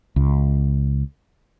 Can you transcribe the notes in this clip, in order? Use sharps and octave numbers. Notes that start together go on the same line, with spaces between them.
C#2